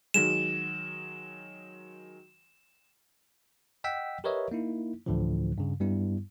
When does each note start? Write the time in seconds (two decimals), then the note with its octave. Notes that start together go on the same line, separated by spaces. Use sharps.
0.14 D#3 F#3 G#3 E7
3.84 D#5 F#5 G5 E6 B6
4.24 G4 A#4 B4 C#5 D#5 E5
4.51 A#3 D#4 E4
5.06 D2 A2 D3 E3 F3
5.58 G2 C#3
5.81 G2 G3 B3 E4